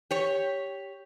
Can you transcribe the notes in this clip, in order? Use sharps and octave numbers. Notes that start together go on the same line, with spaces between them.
G4 C#5